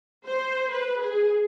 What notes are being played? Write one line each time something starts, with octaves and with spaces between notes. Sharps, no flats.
C5
B4
G#4